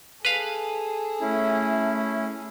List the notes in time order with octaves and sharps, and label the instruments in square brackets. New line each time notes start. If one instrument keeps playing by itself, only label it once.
[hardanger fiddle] G#4 A4 [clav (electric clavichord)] B4 F5
[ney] A3 [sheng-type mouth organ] C#4 E4